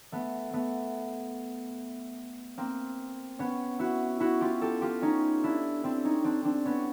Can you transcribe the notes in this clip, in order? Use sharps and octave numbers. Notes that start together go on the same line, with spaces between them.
A3 B3
A3 B3
A#3 C4
B3 C#4
E4 F#4
E4 F#4
F4 G4
G4 A4
F4 G4
C#4 D#4
D4 E4
C4 D4
C#4 D#4
C4 D4
C4 D4
B3 C#4